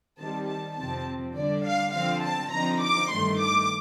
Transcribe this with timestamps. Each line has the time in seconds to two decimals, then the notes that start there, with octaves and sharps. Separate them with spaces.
0.18 D#3 G3 C4 A5
0.47 A5
0.77 F2 C3 F3 C4 A5
1.36 D3 G3 D4 D5
1.65 F5
1.94 D3 F3 C4 F5
2.23 A5
2.52 D3 F3 C4 D#4 A#5
2.82 D6
3.12 G2 D#3 A3 C6
3.40 D6